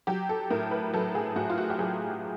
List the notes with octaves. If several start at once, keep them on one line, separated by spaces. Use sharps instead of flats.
F#3 G4
A4
A2 A#4
B4
F#3 A4
G#4
A2 F#4
F4
F#4
G4
F#3 G#4